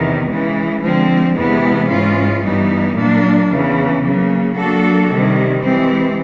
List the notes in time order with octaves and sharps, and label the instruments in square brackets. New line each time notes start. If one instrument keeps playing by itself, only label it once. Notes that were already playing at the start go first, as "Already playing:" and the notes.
Already playing: [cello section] E2 C3 D#3
C#3 E3 G#3
D3 F3 G#3 C4
E2 C3 E3 G#3 B3
G#2 E3 G#3 C#4 F4
G2 E3 G3 B3 D#4
A#2 F#3 A#3 D4
E2 C#3 E3
C#3 F#3 A#3
F#3 A#3 D4 F#4 A4
C3 D#3 G3
C3 E3 G#3 C4